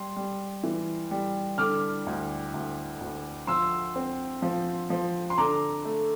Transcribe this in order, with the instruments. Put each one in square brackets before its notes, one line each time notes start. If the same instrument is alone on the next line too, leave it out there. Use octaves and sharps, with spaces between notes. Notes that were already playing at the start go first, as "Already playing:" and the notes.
Already playing: [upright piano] G3 [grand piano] C6
[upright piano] G3
E3
G3
[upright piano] D3 [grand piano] D6 F6
[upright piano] D2
D2
D2
[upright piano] F3 [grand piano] C6 E6
[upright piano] C4
F3
F3
[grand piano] C6
[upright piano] D3 [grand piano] A#5 D6
[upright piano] A3